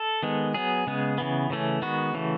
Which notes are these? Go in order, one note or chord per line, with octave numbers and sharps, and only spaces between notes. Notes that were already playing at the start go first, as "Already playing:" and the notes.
Already playing: A4
D#3 G#3 B3
F#3 B3 G#4
C#3 G#3 B3
C#3 E3 B3
C#3 E3 A3 C#4
D#3 G#3 B3 F#4
C#3 E3 A3